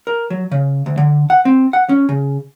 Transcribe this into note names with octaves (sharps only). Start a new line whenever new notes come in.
A#4
F#3
C#3
D2
D3
F#5
C4
F#5
C#4
C#3